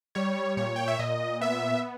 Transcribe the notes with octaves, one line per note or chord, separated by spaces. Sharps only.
G3 C#5
A#2 C#5
G5
E5
A#2 D#5
B3 E5